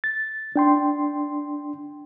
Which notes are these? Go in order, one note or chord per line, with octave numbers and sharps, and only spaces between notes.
A6
D4 G5 C6